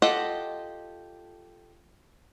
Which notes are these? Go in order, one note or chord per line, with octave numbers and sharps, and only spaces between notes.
F4 G4 A4 D#5 F#5